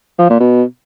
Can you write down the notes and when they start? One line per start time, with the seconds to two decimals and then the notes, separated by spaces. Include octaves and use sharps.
0.19 F3
0.29 A#2
0.40 B2